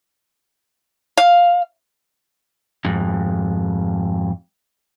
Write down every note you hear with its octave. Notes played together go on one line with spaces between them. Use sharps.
F5
F2 G#2